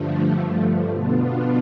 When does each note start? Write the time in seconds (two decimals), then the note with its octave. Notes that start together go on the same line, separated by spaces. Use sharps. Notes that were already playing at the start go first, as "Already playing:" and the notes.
Already playing: G2 D3 F3 A3
0.91 B2 B3 D4 F4